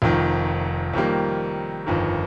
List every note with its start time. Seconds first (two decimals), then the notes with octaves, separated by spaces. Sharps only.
0.02 F1 F2 D#3
0.93 F2 D#3 G3 A#3
1.87 G1 F2 D#3